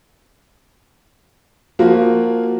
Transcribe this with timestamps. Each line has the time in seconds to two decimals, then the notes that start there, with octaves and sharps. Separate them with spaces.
1.79 F3 A#3 F4 F#4